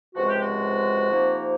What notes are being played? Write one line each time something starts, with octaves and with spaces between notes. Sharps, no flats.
C#2 C3 F3 G#3 F#4
G4
F#4
F2 C3 F3 A#3 D#4